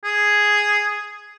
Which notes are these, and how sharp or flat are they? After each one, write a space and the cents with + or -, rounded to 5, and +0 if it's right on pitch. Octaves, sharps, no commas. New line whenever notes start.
G#4 +0